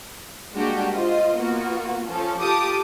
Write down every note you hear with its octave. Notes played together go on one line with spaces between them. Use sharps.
G3 G#3 A#3 D4 F#4 G4
F4 C5 D#5
A#3 B3 F4 F#4
F3 C#4 A4
F4 G4 A4 A5 D6 D#6